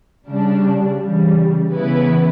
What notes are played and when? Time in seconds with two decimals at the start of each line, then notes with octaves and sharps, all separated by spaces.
0.28 C#3 G3 D4
1.00 C#3 E3 G3
1.73 C#3 E3 B3 E4 B4